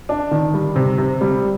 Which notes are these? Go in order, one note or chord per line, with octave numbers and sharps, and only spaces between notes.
D4
D#3
G3
C3
C3
G3